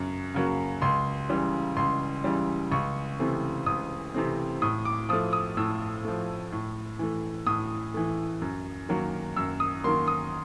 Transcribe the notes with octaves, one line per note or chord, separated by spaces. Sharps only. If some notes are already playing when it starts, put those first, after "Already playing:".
Already playing: F#2 C#3 F#3
C#3 F#3 A#3
C#2 C6
C#3 E3 G3
C#2 C6
C#3 E3 G3
C#2 C#6
C3 E3 A3 C4
C#2 D#6
C3 E3 A3 C4
A2 D#6
D6
F3 A3 D#6
D#6
A2 E6
F3 A3
A2
E3 A3
A2 D#6
E3 A3
F#2
D#3 F#3 A#3
F#2 E6
D#6
D#3 F#3 A#3 C6
D#6